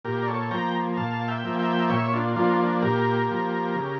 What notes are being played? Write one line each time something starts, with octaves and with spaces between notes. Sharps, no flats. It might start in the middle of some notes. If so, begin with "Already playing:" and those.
A#2 G4 A#4
D5
A4 C#5
F3 A#3 G5 A#5
A#2 F5 A5
E5 G5
F3 A#3
E5 G5
A#2 C#5 E5
D4 F4
F3 A#3 D4 F4
D4
A#2 G4 A#4
F3 A#3
C#3